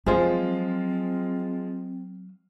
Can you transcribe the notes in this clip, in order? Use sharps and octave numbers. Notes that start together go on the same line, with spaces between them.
F3 F#3 G#3 C4 F4 G#4 C5